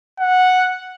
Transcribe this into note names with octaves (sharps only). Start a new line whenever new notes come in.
F#5